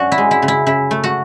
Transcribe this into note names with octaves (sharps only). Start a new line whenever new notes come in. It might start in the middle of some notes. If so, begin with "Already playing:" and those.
Already playing: F#2 D4 F#4
E4
G#3
E4
C#3
E4
C#3 E4
A3
F#4